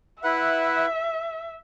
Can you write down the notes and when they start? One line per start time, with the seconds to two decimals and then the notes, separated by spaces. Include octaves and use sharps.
0.23 E4 B4 E5 F#5